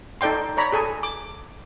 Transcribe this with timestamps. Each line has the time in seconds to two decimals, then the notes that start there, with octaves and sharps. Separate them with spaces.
0.21 D#4 A4 D5 G5 C6
0.57 C#5 D5 A#5 B5
0.72 G#4 A4 G#5
1.03 D6